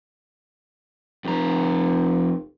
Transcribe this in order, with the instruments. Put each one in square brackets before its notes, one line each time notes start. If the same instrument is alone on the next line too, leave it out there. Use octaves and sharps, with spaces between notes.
[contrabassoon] F1 [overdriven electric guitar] F2 A#5